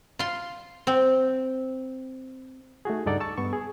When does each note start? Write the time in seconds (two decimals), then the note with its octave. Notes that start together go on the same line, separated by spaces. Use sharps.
0.19 F4 C6
0.87 C4
2.85 A3 D#4 F#4 G#4
3.06 C#2 G2 D#4 A4 D5 F#5
3.20 A5 C#6 E6
3.38 G2 B3 C#6
3.53 G#4